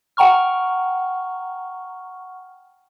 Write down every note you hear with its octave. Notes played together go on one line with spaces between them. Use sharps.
F#5 G5 A#5 C#6 F6